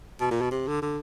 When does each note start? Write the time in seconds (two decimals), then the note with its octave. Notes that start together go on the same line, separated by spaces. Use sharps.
0.20 B2
0.31 A#2
0.41 B2
0.51 C3
0.67 D3
0.82 D3